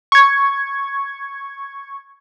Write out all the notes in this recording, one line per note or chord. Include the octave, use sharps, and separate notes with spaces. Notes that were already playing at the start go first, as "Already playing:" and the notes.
C#6 G#6